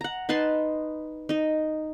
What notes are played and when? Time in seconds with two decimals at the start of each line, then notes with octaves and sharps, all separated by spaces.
0.01 F#5 A#5
0.29 D#4 B4 A5 C6
1.29 D#4 D#5